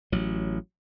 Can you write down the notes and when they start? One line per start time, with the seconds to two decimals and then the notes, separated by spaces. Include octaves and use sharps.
0.12 A1 F#3